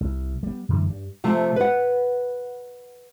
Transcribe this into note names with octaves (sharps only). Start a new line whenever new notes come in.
C2
G3 B3
F#2 D3 E3 A3
G2
C3 F3 A3
B4 F#5